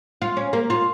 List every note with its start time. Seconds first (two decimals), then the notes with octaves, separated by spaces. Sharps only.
0.22 F4
0.37 C#4
0.53 A#3
0.70 F4